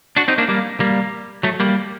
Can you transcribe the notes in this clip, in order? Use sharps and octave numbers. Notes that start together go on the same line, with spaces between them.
D4 F#4
C4 D#4
A#3 D4
G3 A#3
G3 A#3
F#3 A3
G3 A#3